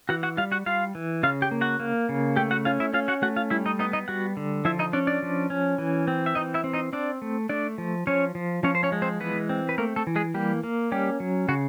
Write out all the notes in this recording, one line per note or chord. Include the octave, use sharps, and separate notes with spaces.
E3 F#4 F#5
F#4 F#5
G3 F4 F5
F#4 F#5
G3 F4 F5
E3
C#3 F4 F5
G4 G5
A#3
F#4 F#5
A#3
C#3
A3 G4 G5
F#4 F#5
C#4 F4 F5
E4 E5
C#4 F4 F5
F#4 F#5
A3 F#4 F#5
F4 F5
G3 E4 E5
D#4 D#5
B3 D#4 D#5
D#4 D#5
G3 F#4 F#5
D3
F3 E4 E5
D#4 D#5
C#4 D4 D5
D4 D5
F3
C#4
E3
C4
E5
E3 D#4 D#5
E4 E5
C4
D#4 D#5
C4 D4 D5
A3
A3 D4 D5
F3
F3 C#4 C#5
F3
F3 C#4 C#5
C5
C#4 C#5
G#3
C4 C5
E3 B3 B4
C4
B4
A3 A#3 A#4
A3 A4
E3
G#3 G#4
G3 A#3 G4
A#3
G3 C#4 G4
F#3
C#3 F#4